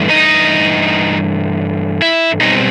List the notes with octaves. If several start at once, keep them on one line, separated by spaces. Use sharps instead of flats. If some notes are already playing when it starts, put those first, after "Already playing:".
Already playing: G2 E3 A3
D#4 D#5
E4 E5
B2 G3 C4 D#4 D#5